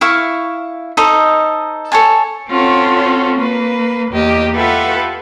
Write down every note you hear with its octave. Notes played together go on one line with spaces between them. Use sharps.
E4 E5 F5 C#6
D#4 A4 C5 D#5
A4 C#5 G#5 A5
C4 C#4 F4 F#4 A4
A#3 B4
E2 A#3 G4 D#5
F4 G4 A4 B4 E5 F#5